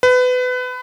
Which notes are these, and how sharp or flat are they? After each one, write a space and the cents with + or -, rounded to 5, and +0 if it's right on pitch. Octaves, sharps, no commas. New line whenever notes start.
B4 +25